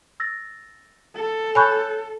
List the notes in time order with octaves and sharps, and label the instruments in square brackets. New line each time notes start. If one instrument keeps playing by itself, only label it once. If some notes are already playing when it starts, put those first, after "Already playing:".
[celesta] E6 A6 A#6
[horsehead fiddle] A4
[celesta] C#5 F#6 G6 [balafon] G#5 B5 C#6